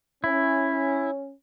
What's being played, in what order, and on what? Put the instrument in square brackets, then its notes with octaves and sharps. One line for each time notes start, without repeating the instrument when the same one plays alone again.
[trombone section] C#4 [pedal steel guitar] E4